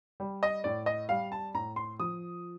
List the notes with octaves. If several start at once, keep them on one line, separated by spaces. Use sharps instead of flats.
G3
D#5
A2 D5
D#5
G3 F5
A5
A2 A#5
C6
F3 D#6